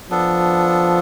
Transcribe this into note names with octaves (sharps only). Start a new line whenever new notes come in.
F3 B3 D4 A4